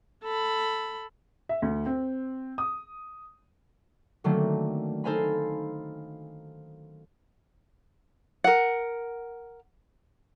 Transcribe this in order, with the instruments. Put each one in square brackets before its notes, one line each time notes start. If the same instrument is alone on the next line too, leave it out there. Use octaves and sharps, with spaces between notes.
[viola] A4 B5
[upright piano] E5
D2
C4
D#6
[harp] D3 D#3 F#3 A3 A#3 C4
D#4 A4 C5 F5 G#5 B5
[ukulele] A#4 F#5